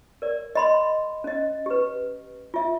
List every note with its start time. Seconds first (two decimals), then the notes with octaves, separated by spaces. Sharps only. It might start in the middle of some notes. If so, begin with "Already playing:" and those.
0.22 A#4 D5
0.55 D#5 B5 C6
1.24 C#4 D#5
1.66 G4 B4
2.54 F4 E5